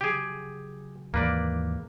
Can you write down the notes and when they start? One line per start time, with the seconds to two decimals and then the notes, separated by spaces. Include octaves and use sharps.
0.01 C#3 F#3 G4 G#4
1.14 D#2 G#2 E3 A#3 B4 D5